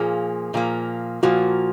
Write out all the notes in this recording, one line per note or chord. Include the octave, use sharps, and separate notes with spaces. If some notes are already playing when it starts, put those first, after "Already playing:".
Already playing: A#2 F3 A#3 G#4
A#2 F3 A#3
A#2 F3 A#3 F#4